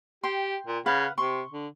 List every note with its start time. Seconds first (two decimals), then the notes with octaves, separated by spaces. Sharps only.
0.24 G4 G5 C6
0.67 A#2
0.86 C#3 B4 F5 F#5
1.18 C3 C6 C#6
1.51 D3